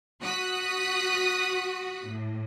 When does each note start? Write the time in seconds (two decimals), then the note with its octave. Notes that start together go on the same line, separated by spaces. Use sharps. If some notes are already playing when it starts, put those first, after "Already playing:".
0.22 F#4 D#6 F#6 B6
2.06 A2